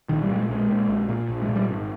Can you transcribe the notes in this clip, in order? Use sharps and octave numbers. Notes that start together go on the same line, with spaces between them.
A#1 D#3
G3
A#2
G#3
A#1 G#3
A#2
A#1
A#2
A#1
G#3
A#2
G3
G#1